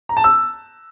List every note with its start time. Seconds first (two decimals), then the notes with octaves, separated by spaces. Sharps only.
0.09 A#5
0.17 A5
0.24 E6